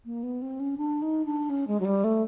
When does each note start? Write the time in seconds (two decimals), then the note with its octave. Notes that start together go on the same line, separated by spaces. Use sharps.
0.05 A#3
0.23 B3
0.42 C4
0.60 C#4
0.78 D4
1.02 D#4
1.25 D4
1.50 C#4
1.68 G#3
1.80 F#3
1.85 G3
2.04 A3